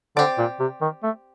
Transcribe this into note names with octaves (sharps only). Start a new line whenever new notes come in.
D3 C4 G4 D5
A#2
C3
D#3
A3